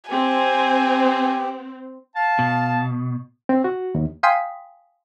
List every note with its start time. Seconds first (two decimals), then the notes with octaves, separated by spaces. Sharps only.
0.11 C4 G4 G#5
2.16 F5 A5
2.39 B2
3.49 C4
3.64 F#4
3.95 D#2
4.23 F5 G5 G#5 C6 D#6 B6